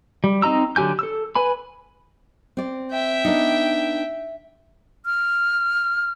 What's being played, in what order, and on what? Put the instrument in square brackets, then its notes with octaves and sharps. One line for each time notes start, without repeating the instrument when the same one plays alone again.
[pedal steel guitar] G3
C4 D#4 D#5 A#5 E6
D3 F#3 G4 G#5 G6
A4 E6
B4 G#5 B5
[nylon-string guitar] C4 D5
[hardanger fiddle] E5 G5
[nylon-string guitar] B3 D4 D#4
[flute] F6